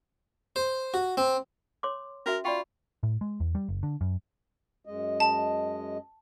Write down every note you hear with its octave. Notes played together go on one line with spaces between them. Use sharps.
C5
F#4
C4
C#5 C6 D6
C#4 F#4 A#4 E5
F4 D5 G5 B5 C#6
A2
G#3
E2
G3
F#1
D3
F#2
F#2 G#3 D#5
A5